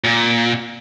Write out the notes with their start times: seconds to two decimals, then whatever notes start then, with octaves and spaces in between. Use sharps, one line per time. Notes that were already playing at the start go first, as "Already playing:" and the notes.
0.04 A#2